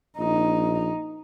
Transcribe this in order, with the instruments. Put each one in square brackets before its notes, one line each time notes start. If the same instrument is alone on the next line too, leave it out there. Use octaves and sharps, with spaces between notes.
[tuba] A#1 [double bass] D#4